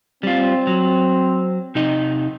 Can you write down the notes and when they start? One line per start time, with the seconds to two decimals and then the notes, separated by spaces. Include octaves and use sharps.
0.23 G3 C4 F4
0.67 F#3
1.75 C3 D#4 D#5